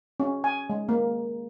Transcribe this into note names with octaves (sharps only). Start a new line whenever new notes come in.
C#4
G#5
G#3
A#3